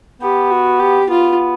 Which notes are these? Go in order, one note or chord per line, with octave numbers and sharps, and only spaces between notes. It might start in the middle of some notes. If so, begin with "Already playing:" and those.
B3 G4
F#4
G4
B3 F4